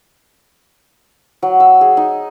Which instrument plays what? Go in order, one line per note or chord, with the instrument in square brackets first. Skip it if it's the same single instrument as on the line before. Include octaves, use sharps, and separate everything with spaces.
[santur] F#3
E6
G#4
D#4